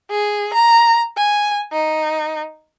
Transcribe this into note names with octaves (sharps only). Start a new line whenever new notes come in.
G#4
A#5
G#5
D#4